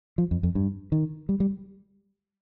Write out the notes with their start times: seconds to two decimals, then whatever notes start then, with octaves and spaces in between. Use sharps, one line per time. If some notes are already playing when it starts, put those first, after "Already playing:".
0.18 F3
0.31 F2
0.43 F2
0.55 G2
0.92 D#3
1.29 G3
1.40 G3